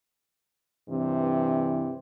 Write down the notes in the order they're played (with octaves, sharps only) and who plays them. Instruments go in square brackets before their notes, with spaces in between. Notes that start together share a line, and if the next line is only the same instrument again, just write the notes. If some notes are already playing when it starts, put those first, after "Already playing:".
[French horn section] G2 C3 E3